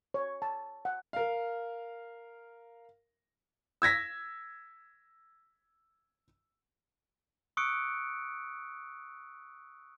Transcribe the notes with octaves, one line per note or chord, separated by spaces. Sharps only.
C#5
A5
F#5
A#4 F5
E6 G#6 A#6 B6
C#6 D#6 E6 F#6 C#7 D7